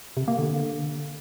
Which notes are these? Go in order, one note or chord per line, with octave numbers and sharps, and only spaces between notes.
C3
A#3
D3